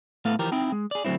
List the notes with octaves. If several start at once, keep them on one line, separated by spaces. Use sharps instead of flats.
A2 A3 B3 A4 F5
E3 F3 G4 A#4
C4 D#4 E4 G5
G#3
G#4 D5
D2 D3 F#3 A3 C4 E4